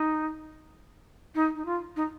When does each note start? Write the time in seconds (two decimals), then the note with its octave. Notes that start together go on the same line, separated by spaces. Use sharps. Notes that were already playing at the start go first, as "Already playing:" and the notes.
Already playing: D#4
1.35 D#4
1.55 D#4
1.66 F4
1.96 D#4